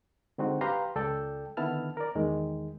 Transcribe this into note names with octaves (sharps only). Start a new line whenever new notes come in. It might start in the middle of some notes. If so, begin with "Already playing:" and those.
D3 G#3 C4 D#4 F#4
G4 B4 F5 A#5 C6
C#2 A4 D5 G5
D3 D#3 B3 E4 A5 F6
A#4 D5
E2 D#3 G#3